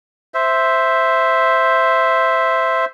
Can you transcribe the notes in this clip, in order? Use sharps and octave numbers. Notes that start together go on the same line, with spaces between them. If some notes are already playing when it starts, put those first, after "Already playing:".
C5 E5